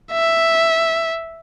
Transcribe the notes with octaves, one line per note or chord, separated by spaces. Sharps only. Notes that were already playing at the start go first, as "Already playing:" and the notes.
E5